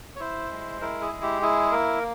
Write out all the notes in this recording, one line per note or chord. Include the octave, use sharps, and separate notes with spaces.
C#5
E4 C5
G#3
E4 A#4
G#4
G#3
G4
E4 G#4
A#3 A#4